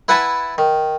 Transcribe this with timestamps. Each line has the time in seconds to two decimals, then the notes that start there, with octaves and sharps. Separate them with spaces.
0.09 E4 B4 F#5 G#5 A5 B5
0.58 D#3